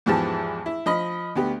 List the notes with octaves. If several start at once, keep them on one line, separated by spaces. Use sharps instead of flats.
E2 G#2 E3 F3 G4 A5
E4
F3 D#5 B5
D2 B3 G4